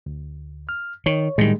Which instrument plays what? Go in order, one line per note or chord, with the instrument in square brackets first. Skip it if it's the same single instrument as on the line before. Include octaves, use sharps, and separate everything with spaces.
[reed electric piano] D2
F6
[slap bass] D#3 [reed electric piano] C#5
[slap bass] A2 D#3 [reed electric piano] G3 G#3